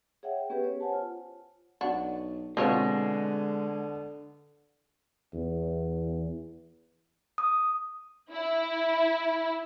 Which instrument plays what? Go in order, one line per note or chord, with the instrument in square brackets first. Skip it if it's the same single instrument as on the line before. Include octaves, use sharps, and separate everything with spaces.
[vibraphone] G#4 C#5 E5 F#5 G5
B3 C#4 G4 G#4 B4
C#5
C5 C#5 F#5 G#5 A5
F4
[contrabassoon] B1 [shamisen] D4 F#4
[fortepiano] B2 [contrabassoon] D3 [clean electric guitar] G#3 [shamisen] C4 F4 C#5
[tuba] E2
[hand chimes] D#6
[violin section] E4